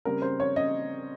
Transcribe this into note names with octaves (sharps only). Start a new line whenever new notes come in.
C#3 G3 C4 A#4
C5
C#5
D#5